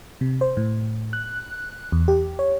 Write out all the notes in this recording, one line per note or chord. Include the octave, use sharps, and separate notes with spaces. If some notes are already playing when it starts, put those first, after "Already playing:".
C3
C5
A2
F#6
E2
G4
C#5